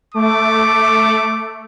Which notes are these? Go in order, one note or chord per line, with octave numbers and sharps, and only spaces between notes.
A3 D6